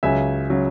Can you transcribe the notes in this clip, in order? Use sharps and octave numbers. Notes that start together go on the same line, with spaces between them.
C#2 C#3 F#3 E5 G#5
C#3 F#3